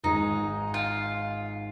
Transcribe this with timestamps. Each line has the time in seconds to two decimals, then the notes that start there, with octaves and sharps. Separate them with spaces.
0.04 G#1 G#2 G#3 D#4
0.74 F4